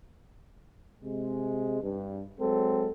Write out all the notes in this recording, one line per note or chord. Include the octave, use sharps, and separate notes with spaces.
C3 G#3
G2
F#3 G#3 C4 A4